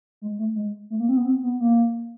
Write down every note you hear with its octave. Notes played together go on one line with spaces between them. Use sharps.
G#3
A3
G#3
A3
A#3
C4
B3
C4
B3
A#3